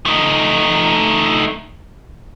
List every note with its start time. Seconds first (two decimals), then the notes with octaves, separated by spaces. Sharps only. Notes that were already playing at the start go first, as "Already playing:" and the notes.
0.06 A3 D#4